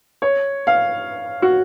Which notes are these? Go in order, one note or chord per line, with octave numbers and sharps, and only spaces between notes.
C#5
F5
F#4